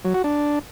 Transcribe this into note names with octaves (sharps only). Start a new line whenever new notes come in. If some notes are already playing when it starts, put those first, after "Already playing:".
F#3
F#4
D4